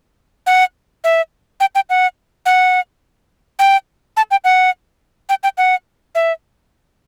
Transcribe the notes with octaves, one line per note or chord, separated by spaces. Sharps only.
F#5
E5
G5
G5
F#5
F#5
G5
A5
G5
F#5
G5
G5
F#5
E5